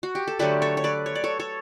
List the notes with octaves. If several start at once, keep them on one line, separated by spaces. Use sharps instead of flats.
F#4
G4
A4
D3 F#3 A3 G4 B4
A4 C#5
C#5
B4 D5
C#5
D5
A4 C#5
A4 C#5